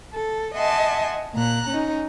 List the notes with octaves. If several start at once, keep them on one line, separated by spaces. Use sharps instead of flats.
A4
D#5 E5 F#5 G#5 A5 C6
A#2 A#5 F#6
C#4 D#4